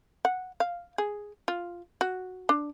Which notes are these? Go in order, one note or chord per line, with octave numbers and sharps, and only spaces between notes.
F#5
F5
G#4
F4
F#4
D4